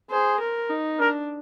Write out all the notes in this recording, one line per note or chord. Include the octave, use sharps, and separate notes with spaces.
G#4 C5
A#4
D#4
D4 A#4